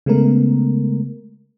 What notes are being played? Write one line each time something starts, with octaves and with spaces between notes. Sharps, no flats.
C#3 G#3 A3 B3 A#4